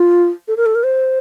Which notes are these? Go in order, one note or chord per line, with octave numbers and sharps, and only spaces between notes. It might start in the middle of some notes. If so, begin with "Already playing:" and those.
Already playing: F4
A4
A#4
A4
A#4
C5